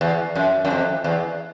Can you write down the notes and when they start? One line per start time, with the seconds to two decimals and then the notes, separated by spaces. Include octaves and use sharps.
0.01 E2
0.35 F#2
0.65 F#2
0.70 F2
1.04 E2